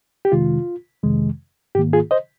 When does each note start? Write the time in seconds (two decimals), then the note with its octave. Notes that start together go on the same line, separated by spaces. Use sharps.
0.25 G4
0.32 F2 C3 D#3 G#3 F4
1.03 F2 C3 D#3 G#3
1.75 G#2 D#3 A#3 G4
1.93 F4 G#4
2.11 C5 D#5